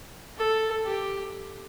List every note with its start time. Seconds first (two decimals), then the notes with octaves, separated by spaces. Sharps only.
0.38 A4
0.86 G4